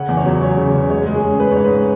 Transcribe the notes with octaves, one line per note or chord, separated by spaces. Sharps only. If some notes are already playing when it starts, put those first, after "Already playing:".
Already playing: C#3 C#4 F#5
E2
C#5
F#3
F#3 C#5
C#3
C#3
G#3 C#5
G#3
G#4
C#4
G#3 B4
G#2 C#5
B4